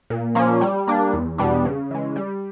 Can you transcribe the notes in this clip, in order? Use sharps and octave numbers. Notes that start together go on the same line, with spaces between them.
A#2
F3 A#3 C#4
G3
A#3 D4
E2
B2 G3 B3 D4
C#3
E3 G#3
G3